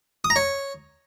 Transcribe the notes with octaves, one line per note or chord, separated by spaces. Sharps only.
D#6
A#5
C#5